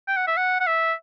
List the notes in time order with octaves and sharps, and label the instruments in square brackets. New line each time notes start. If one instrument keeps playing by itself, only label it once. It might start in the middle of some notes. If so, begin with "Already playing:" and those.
[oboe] G5
F#5
E5
F#5
F#5
E5